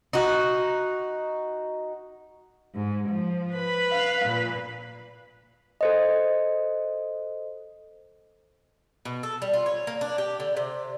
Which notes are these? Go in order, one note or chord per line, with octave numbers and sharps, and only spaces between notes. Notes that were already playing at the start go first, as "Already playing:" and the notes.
D#4 F#4
G#2
F3
B4 B5
F5
A#2
A4 C5 D#5
B2
A4
G3
F4
C#5
A#3
D4
G4
D3
C3